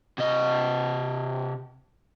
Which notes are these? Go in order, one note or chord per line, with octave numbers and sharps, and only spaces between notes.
C3 D#5